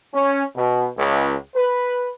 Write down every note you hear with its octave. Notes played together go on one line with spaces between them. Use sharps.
C#4
B2
C#2
B4